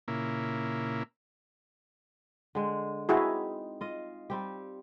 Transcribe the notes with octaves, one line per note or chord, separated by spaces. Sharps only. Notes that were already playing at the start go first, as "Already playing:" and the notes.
A#2 C#3 A#3 E4
D3 G#3
C4 D#4 E4 F#4 G#4
F4 D#5
G3 C4 G4